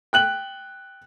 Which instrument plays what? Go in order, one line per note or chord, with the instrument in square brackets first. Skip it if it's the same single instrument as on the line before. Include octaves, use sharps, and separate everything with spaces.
[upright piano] G5 F#6 F#7